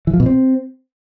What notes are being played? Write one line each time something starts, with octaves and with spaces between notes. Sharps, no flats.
E3
F3
B2
C4